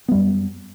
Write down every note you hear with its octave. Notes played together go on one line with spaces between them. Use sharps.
F#2 G3 B3